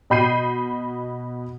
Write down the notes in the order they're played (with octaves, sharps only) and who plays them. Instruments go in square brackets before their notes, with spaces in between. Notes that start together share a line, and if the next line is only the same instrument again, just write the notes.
[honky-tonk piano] B2 D#5 B5 G6 C7 D#7